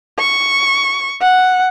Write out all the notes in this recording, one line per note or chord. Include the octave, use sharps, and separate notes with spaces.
C#6
F#5